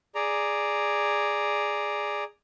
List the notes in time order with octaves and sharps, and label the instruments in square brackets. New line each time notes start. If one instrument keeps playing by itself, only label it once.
[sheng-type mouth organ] G#4 D5 A#5